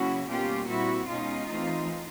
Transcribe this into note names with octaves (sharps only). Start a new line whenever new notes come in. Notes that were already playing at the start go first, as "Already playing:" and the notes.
Already playing: C#3 F#3 A#3 C#4 E4 F#4
B2 G3 A#3 C#4 F4 G4
A#2 G3 C4 E4 F#4
B2 G#3 C#4 D#4 F4
E3 A3 C4